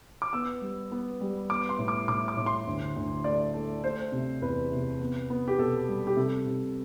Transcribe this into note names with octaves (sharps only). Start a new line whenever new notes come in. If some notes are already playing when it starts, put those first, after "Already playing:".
D6
B3 E6
G3
B3
G3
B3 D6
C6
A2
D6
A2 D6
D6
A2
C6
D2
D2
A3 D5
A3
A3 C5
C3
E2 B4
C3
B3
B3
G4
B2 A4
G3
G4
C3 A4
C3